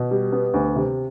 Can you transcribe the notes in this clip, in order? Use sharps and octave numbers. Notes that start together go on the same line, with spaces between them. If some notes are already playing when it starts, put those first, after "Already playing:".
Already playing: B2
G3
B3
D2
C3